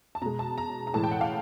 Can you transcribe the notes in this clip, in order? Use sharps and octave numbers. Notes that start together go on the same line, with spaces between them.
A5
B2 G#3 A#5
A5
A#5
A#5
A2 E3 G#3 A5
G5
F#5
F5